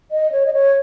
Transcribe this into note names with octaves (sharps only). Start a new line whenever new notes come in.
D#5
C#5
D#5
C#5